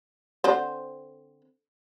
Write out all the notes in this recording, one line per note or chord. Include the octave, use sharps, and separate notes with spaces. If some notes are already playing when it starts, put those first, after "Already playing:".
D3 C4 C5